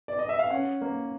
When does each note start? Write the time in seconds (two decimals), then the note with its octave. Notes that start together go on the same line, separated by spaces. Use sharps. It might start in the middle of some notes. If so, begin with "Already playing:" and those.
0.08 D5
0.19 D#5
0.29 E5
0.39 F5
0.50 C#4 F#5
0.81 A#3